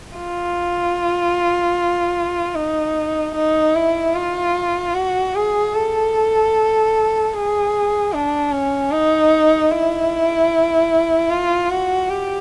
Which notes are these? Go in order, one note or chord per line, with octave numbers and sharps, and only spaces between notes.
F4
D#4
D#4
E4
F4
F#4
G#4
A4
G#4
D4
C#4
D#4
E4
F4
F#4
G4